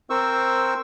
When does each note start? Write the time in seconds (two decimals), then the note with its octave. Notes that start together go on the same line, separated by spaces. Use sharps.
0.10 C4 A#4 C5 C#6 E6